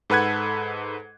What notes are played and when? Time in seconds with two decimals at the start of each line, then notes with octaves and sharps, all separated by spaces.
0.10 G#2 A4 B4 F#5 F#6 G#6